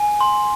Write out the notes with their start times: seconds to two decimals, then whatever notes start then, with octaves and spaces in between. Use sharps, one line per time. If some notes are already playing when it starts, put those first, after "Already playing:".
Already playing: G#5
0.21 C6